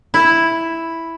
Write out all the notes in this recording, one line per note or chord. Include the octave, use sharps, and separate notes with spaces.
E4